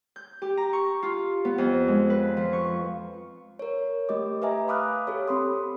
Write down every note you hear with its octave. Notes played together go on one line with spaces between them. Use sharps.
G6
G4
A#5
C#6
F4
B3
F2
G#3
B4
F3
C#6
A#4 C#5
A3 G4 D#5 D6
B4 D#5 E5 G#5 A#5
F5 B5 D6 D#6 F6 F#6
G4 A4 C#5
C4 B5 C6 D#6